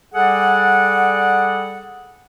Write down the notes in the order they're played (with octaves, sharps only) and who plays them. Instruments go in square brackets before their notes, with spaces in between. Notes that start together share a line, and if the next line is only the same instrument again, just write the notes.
[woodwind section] G3 G#4 A4 D5 F#5